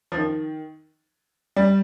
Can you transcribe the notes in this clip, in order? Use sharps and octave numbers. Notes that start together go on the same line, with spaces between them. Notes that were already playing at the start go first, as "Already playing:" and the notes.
F3
D#3
G3